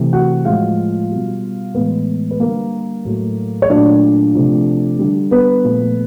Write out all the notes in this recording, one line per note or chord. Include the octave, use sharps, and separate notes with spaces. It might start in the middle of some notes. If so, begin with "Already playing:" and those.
Already playing: C3 E3 A3
F#4 F#5
A2 F3 G#3 F4 F5
B2 G3
A2 E3 G#3 B3 B4
B4
D3 G3 A#3 A#4
A2 F#3 A3
C#5
A#2 F#3 A3 D4 D5
C3 F3 A3
D3 G3
B3 B4
A#2 F3 A3